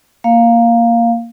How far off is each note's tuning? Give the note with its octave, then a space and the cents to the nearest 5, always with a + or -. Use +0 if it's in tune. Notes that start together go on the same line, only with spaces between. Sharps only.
A#3 -5 F5 +0